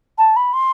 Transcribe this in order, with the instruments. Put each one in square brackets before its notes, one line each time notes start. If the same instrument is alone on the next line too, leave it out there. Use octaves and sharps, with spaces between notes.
[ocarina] A5
B5
C6